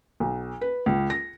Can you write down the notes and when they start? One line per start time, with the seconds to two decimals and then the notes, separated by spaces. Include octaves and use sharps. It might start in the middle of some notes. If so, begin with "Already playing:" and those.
0.20 B1
0.61 B4
0.86 C#2
1.10 A#6